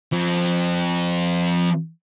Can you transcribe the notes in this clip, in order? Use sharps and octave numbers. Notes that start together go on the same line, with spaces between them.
F3 C4